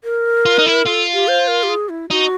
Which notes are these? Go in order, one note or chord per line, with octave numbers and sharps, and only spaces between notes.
A#4
F4
D#4
E4
F4 A4
G4
C5
A#4
G4
G#4
E4
D#4 F#4